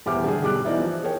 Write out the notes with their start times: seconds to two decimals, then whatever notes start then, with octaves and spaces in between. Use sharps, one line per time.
0.06 D#1 E2 G4 E5 D6 F6
0.24 D3 G3 D4 G4 G#4
0.42 B1 G3 D6 F#6
0.65 E3 B3 D#4 D5 E5
0.80 F3
1.03 G#4 A#4 C#5 G5